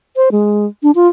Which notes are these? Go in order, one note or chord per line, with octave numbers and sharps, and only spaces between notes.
C5
G#3
D4
F4